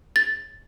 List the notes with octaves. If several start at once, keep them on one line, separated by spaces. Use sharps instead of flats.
A6